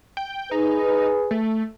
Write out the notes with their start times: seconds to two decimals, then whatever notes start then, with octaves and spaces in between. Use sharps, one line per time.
0.17 G5
0.51 D#4 G#4 B4
1.31 A3